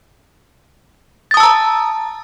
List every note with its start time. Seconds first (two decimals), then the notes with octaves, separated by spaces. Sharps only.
1.31 A6
1.34 D#6
1.37 A5
1.40 E6
1.43 A#5